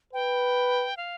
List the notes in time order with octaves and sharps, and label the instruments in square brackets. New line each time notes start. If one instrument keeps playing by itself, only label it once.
[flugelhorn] B4 [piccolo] G5
[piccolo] F5